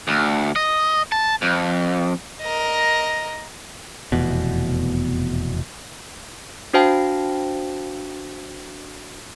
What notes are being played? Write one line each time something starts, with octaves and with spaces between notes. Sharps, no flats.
D2
D#5
A5
F2
A#4 D#5
F1 E2 B2
D4 F#4 C5 F5 G5 A5